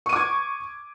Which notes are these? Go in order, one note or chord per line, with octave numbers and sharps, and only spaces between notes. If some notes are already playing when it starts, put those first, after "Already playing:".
C#6 D6 G#6 D#7